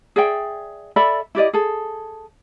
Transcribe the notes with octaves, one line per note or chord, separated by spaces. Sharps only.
G#4 D5 E5 G5
A4 D5 E5 B5
E4 G4 D5 D#5
G#4 A4